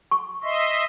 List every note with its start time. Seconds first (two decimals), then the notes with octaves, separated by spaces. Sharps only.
0.11 C#6
0.43 D#5 E5 C6